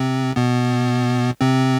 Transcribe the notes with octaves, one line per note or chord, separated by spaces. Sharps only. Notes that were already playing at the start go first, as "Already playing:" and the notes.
Already playing: C3 C4
B2 B3
C3 C4